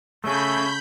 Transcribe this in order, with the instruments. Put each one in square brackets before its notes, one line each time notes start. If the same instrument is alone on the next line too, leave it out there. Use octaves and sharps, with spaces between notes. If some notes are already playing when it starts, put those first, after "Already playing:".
[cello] C#3 A4 [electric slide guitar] A3 C#4 [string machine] B5 G6 [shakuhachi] C#6